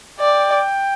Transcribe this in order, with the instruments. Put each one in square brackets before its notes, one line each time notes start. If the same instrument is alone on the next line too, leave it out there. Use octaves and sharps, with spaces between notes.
[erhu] D5 [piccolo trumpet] G5